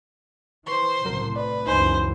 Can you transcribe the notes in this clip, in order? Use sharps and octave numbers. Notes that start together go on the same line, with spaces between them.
E3 B4 C5 C6 C#6
C2 A2 C#3 F#3 A#4
B4 D5
C#2 F#2 E3 D#4 C5 G#5